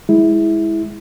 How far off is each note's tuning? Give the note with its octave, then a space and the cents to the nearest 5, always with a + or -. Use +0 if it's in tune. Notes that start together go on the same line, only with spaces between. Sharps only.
G#3 +0 E4 -15